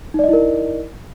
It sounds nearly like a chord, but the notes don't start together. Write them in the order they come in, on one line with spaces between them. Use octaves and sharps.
D#4 D5 D#5 E4 A#4